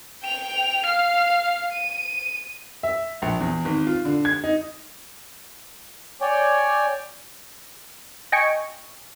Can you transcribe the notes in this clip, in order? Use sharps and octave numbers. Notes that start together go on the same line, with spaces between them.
G5 F7
F5 F6
D#7
E5
A#1
E2
G#1
F4
D3
G#6
D#4
C#5 D5 G5 G#5
D#5 G5 G#5 C#6